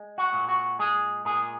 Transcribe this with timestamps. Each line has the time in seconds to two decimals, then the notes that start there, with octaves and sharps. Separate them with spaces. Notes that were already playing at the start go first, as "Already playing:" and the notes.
Already playing: G#3
0.18 F#4
0.33 A#2
0.49 F#4
0.79 G#3 G#4
1.25 A#2 G#4